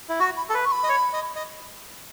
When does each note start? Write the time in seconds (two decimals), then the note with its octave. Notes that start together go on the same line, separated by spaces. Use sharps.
0.09 E4
0.20 F#4 C#6
0.37 B5
0.49 A4
0.54 B4 A5
0.64 C#6
0.72 B5
0.84 D#5
0.89 C#5
1.13 D#5
1.36 D#5